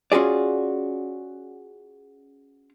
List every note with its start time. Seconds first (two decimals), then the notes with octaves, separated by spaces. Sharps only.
0.12 C#4 F4 F#4 G#4 D5